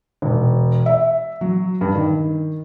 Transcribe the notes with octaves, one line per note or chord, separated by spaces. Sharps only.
E1
E5
F#3
G2
D#3